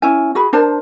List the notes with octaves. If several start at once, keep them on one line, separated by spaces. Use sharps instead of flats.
C#4 E4 G#5
F#4 G#4 B5
D4 A#4 C5 A5